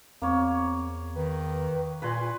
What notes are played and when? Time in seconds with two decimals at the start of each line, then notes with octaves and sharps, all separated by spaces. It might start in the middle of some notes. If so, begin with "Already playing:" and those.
0.22 E2 A#3 C4 C#5
1.15 D#3 B4
2.02 A#2 B4 G#5 A#5 C6
2.21 F4